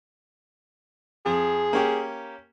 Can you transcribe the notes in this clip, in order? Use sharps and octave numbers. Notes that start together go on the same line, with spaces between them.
F2 G#4
A#3 C#4 G4